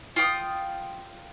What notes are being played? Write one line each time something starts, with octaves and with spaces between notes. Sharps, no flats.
F4 G5 D#6